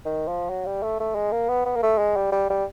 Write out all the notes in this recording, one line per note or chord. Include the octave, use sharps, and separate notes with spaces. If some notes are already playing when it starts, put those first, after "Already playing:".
D#3
F3
F#3
G3
A3
A3
G#3
A#3
B3
B3
A#3
A3
G#3
G3
G3
G3